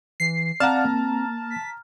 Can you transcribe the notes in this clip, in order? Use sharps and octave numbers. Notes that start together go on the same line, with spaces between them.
E3 C7
C4 D5 F5 F#5 A5 A#5 F6
A#3
B6